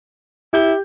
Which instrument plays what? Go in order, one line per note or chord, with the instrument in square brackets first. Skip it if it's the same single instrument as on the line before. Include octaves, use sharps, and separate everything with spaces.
[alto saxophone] E4 [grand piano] G4 G6 G7